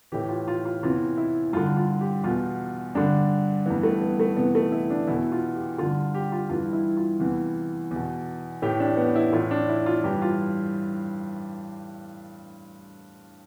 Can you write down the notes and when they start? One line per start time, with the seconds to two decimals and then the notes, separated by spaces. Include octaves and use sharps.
0.12 A2 E3 G4
0.29 F4
0.48 F4
0.65 F4
0.83 E2 C3 E3 F4
1.18 E4
1.53 G2 D3 F4
1.77 F4
2.01 G4
2.24 E2 B2 F4
2.95 G2 D3 D4
3.66 G2 E3 B3
3.83 A3
4.01 B3
4.20 A3
4.37 E2 C3 E3 B3
4.55 A3
4.72 E4
4.90 D4
5.07 E2 B2 E4
5.32 F4
5.55 G4
5.78 G2 D3 F4
6.15 G4
6.32 F4
6.50 G2 E3 F4
6.73 E4
6.97 F4
7.20 E2 C3 E3
7.91 E2 B2
8.62 A2 E3 G4
8.80 D4
8.97 B3
9.16 E4
9.32 A2 E3 F4
9.51 D4
9.69 E4
9.86 F4
10.04 G2 E3 G4
10.22 F4